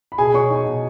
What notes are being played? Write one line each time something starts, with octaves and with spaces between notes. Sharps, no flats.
B5
B2 G#4 G#5
B2 C#5 C#6
D#4
B2